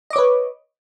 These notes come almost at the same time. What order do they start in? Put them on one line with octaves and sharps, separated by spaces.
D#5 D6 C#5 B4